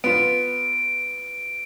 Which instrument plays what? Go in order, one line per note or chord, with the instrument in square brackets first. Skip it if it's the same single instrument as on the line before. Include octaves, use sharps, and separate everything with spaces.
[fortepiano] B3 F4 [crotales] D7